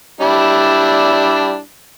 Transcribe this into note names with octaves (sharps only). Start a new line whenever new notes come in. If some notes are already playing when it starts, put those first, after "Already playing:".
G3 D4 E4